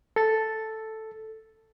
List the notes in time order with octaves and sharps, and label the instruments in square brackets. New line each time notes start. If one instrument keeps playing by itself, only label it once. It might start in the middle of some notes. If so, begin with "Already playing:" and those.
[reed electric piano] A4 A6